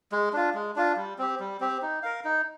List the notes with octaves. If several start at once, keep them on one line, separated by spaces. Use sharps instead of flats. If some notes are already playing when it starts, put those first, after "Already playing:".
G#3
D4 F4
G#3
D4 F4
G3
C4 G4
G3
C4 G4
D#4
A#4 F5
D#4